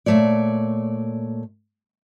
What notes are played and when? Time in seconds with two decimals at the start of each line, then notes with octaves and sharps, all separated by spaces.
0.06 A#2 C#3 A3 C#5 D5